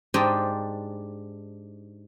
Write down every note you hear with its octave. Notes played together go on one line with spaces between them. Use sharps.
G#2 D4 G4 C5 D#5 A#5